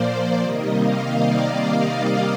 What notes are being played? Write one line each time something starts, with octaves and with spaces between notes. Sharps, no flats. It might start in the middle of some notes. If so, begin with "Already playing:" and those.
Already playing: A#2 F3 A#3 C5 D5
C3 D#3 G3 A#3 D#5
F5
D5